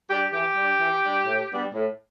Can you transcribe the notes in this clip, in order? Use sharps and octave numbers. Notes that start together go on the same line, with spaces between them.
G3 D4 G4
E3 G4
G3 D4
E3
G3 D4
A2
G3 B3 D4
A2